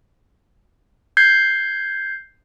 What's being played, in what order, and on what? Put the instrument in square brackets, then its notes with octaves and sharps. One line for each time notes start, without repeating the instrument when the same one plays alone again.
[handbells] G6 G#6 C7